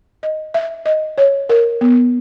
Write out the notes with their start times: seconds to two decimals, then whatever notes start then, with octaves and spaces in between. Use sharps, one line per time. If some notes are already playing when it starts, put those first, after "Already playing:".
0.23 D#5
0.54 E5
0.86 D#5
1.18 C#5
1.49 A#4
1.81 B3